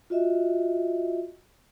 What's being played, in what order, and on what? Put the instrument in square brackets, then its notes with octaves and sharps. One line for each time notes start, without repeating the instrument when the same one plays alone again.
[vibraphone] F4 F#4 D#5 E5